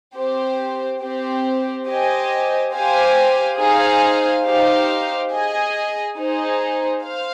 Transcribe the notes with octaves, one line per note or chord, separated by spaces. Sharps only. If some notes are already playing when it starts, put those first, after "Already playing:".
C4 G4 C5
C4 G4 C5
G4 C5 D#5 G#5
G4 C5 F5 G#5
D#4 G#4 C5 F5 G#5
D#4 G4 C5 F5
G#4 D#5 G#5
D#4 G#4 C5
C5 F5